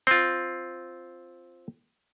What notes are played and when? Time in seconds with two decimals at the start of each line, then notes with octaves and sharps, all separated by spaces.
0.07 C4 F4